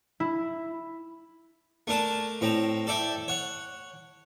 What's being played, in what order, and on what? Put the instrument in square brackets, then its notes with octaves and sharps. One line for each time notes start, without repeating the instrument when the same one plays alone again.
[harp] E4
[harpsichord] A3 D4 A#4 A5
A2 C4 A#5
A4 D5 E5 G5
C#5 F#5